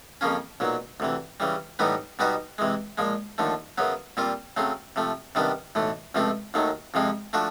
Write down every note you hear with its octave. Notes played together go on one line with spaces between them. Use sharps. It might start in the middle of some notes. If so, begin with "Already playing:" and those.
F2 C#3 F3 A#3 C#4
B1 A#2 F#3
D2 C3 E3
C#3 E3 G3
A2 E3 G3 B3 D#4
B2 G3 B3 D#4 F#4
C3 E3 G#3
A#2 F3 G#3
D#2 D3 F3 A3
F#2 C#3 F#3 B3
A#2 G3 C4 F4
C#3 F#3 A3 C4
C3 F3 A3
C3 D#3 G3 B3 D4
B1 A2 E3 A3
C#2 C3 F3 A3 C4
D#2 D#3 F#3 A3
F2 C3 F3 G#3 C4
F3 A3 D4 F#4